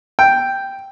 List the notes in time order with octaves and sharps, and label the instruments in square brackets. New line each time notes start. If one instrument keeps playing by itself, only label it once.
[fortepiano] G5